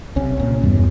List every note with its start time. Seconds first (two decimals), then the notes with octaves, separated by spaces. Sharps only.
0.16 B1 C3 C#4
0.37 C2 A#2 C#3
0.64 E2 G2 B2